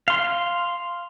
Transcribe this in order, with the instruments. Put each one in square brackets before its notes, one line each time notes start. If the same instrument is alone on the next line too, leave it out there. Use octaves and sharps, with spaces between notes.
[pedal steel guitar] F5 C6